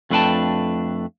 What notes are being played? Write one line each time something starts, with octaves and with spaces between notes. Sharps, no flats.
F2 A3 D4 B4 G5 A5